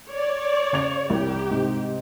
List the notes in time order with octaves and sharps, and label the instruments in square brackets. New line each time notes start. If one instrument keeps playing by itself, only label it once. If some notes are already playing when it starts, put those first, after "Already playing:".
[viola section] C#5 D5
[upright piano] C#3 G#6 F7
[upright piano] C2 [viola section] G4
[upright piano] G#2 C3